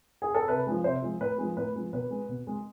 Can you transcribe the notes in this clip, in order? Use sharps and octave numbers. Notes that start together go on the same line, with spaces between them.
G#4
A4
C3 B4
F3 G#3
C3 C5
F3 G#3
A2 B4
F3 G#3
A2 B4
F3 G#3
B2 B4
G#3
B2
G#3